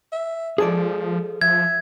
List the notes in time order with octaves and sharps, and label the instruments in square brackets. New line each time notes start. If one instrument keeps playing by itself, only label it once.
[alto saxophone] E5
[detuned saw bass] F3 [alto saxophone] G#3 [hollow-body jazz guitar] G#4 A4 D5
[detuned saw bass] F3 [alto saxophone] E5 [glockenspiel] G#6